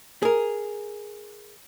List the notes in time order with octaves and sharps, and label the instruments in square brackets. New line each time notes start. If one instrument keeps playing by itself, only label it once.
[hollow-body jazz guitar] G#4 A#4